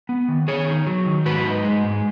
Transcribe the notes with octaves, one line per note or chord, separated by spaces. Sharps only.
B3
D#3
D#3 G#4 C#5
D#4
F#3
D#3
G#2 F#4 B4
D#4
G#3
G#2